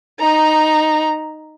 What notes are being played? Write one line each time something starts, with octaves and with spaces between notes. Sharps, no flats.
D#4 A#5